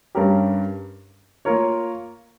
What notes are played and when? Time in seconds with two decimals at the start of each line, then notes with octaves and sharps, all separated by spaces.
0.15 G2 G3 C#4 G4 A#4
1.45 A#3 F4 A#4 C#5